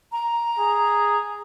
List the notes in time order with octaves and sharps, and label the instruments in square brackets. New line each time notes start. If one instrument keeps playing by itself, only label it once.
[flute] A#5
[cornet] G#4